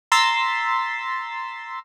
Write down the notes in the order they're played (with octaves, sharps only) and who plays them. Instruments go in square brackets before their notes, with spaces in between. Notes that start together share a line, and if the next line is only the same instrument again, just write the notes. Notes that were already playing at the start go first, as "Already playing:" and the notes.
[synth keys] A#5 C6 E6 A6 B6